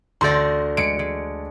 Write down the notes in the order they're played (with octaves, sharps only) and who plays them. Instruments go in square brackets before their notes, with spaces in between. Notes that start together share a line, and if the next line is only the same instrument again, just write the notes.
[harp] D2 A4 D5 [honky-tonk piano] C6 G6 A#6
[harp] G#3 [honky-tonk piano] C#7 D7
[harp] G#3